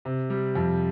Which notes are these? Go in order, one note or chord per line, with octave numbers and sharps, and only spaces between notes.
C3
G3
F2